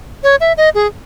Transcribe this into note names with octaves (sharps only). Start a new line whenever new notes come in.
C#5
E5
D#5
G#4